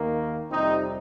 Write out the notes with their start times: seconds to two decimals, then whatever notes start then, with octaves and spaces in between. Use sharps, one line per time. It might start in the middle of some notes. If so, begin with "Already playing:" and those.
Already playing: D#2 D#3 A#3
0.50 F2 C3 G3 C4 D#4